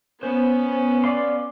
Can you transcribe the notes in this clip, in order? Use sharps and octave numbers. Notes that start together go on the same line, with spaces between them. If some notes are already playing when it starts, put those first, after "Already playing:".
B3 C#4 C5
D5 F5 C6